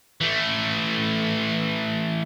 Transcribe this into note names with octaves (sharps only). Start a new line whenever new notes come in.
E3 A3